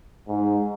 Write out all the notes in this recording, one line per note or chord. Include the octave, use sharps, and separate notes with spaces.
G#2